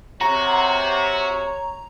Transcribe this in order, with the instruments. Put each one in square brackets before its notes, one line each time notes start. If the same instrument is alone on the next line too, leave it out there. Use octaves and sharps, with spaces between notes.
[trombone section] C3 [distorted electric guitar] F#4 [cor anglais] C#5 [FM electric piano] A#5